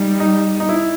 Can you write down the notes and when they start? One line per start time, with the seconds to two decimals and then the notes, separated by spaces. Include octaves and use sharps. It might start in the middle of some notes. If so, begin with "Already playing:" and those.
Already playing: G3 D#4
0.20 D#4
0.60 D#4
0.69 E4